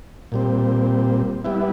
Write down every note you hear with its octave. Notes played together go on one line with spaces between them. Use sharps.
A#2 G3 C4
G3 B3 E4